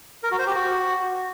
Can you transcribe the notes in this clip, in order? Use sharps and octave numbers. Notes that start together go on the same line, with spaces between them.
A#4
F#4
C5
G4
F#4